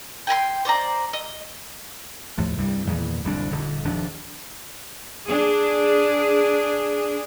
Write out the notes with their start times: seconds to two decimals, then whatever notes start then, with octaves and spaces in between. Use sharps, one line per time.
0.27 G5 G#5 A#5 C6
0.65 C5 D5 D#5 A#5
1.13 D#5
2.38 D#2 A2 F3
2.58 C2 G2 C3 G3
2.87 E2 A#2 D#3 E3
3.24 D1 C2 F2 D4
3.51 D#1 D3
3.85 D#1 D#3 F3 D4
5.27 D4 G#4